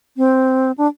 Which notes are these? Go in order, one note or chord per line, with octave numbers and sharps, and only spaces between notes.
C4
D4